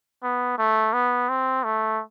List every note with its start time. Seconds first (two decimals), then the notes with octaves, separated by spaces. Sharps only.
0.23 B3
0.58 A3
0.94 B3
1.29 C4
1.65 A3